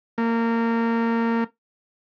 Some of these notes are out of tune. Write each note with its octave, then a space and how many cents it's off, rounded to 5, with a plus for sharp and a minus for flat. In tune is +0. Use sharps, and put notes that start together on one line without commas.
A#3 -20